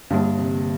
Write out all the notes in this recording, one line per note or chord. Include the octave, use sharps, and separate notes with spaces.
G2 D3 G3 A#3
C3